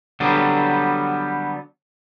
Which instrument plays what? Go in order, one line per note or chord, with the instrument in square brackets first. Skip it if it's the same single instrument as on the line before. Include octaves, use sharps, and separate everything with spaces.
[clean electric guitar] D3 F#3 G3 B3